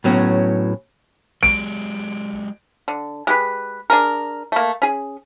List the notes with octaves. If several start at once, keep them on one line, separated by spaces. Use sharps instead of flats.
A2 F#3 B3 C#4
F#3 G#3 D7
D3
G#3 G4 B4
D4 G#4 A#4
A3 A#3
C#4 G#4